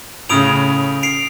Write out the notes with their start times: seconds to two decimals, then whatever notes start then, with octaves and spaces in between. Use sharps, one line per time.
0.29 A2 C#3 D#6 D7 F7
1.03 C7 D7 F7